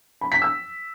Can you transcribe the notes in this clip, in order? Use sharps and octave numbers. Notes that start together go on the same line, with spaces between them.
B5
B6
E6